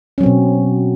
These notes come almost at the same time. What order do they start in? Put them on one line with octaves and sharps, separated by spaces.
C#4 F#3 C4 B2